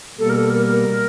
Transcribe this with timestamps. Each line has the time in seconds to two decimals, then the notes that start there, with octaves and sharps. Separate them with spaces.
0.18 B2 G3 A#3 A4
0.30 A#4
0.35 A4
0.50 A#4
0.66 A#4